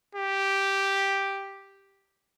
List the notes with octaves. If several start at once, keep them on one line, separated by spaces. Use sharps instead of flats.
G4